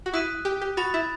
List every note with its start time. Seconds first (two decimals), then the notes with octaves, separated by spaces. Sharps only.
0.06 F#4
0.13 E4 D#6 F#6 B6 D#7
0.45 G4
0.61 G4
0.77 F#4 B5 D#6 A6
0.94 E4